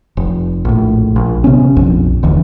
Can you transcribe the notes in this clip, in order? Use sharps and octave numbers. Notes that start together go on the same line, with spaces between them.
F1
A#1 A2
A#1
C3 B3 C#4
A#1 F2
D#1 D2 E3